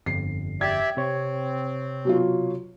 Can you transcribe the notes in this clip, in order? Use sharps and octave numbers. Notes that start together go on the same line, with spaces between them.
G1 F2 C7
G4 D5 E5 G#6
C3 C4 C#5
B2 F#3 F4